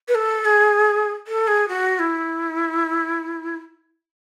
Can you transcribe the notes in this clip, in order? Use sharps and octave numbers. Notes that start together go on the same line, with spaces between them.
B4
A4
G#4
A4
G#4
F#4
E4